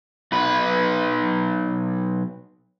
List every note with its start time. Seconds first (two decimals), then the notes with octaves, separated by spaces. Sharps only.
0.32 B1 B4